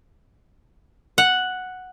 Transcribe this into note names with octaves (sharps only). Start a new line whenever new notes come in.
F#5